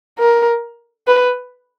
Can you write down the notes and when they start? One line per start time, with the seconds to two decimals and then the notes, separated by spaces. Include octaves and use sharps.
0.19 A#4
1.07 B4